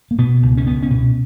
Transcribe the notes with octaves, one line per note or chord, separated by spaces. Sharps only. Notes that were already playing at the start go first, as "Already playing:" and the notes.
A#3
B2 B3
C#2
C#4
C#2 B3
C#4
B2